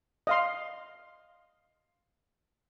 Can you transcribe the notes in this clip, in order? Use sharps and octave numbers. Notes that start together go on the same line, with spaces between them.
D#5 F5 C6